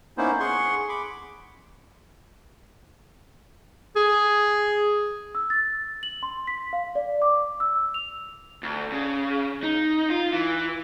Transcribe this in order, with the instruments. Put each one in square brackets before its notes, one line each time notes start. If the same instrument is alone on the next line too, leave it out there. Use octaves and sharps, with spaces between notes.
[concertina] A#3 B3 C#4 D#4 E4 C5
G#4 F#5 C6 C#6
B5 D6
[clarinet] G#4
[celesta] E6
A6
F#7
C6
B6
F5
D5
D6
E6
F7
[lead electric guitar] D2
C#3
D#4
F4
E3